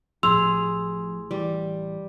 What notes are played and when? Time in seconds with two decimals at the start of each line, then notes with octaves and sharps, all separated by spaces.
0.23 A1 A2 F3 G#4 C6 E6 F7
1.31 E3 G3